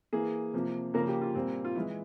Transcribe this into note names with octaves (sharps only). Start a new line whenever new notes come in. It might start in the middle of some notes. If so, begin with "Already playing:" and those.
E3 A#3 G#4
C3 F3 A#3
C#3 F3 A#3 A#4
G4
F4
A#2 G3 A#3 C4
F4
E3 G#3 E4